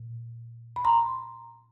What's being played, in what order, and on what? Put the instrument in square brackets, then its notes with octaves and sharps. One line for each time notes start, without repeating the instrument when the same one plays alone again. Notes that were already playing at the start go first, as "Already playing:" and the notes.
Already playing: [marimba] A#2
B5
A#5 C6